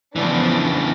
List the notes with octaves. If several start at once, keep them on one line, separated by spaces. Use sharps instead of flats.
C#3 E3 F3 B3 D4